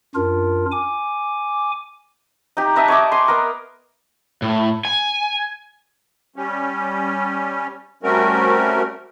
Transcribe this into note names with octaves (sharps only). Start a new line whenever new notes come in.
F#2 D4 F4 A#4
G#5 D6
D#4 G4
B4 D#5 E5 A5
C#5 D#5 D6
G#5 C6
B3 A#4
A2
G#5
G3 C#4
G3 A3 C4 C#4 F#4 A#4